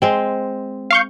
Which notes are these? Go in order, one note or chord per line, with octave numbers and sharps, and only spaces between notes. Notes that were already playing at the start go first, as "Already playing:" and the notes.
G#3 C4
F5 C#6 G6